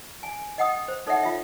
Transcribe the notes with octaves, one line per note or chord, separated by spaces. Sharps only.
G#5
D#5 F#5 G5 D#6
C5
D#4 A4 C#5 E5 F#5 G5
F4 E5